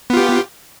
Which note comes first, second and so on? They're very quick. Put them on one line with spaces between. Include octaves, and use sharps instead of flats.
B3 F4 G4